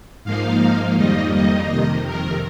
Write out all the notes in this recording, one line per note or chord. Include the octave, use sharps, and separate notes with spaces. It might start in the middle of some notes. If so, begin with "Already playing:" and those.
G#2 F3 A#3 D#4 F5
F2 D#3 G3 A#3 D#4 D#5
D#5
F2 C3 D#3
A#4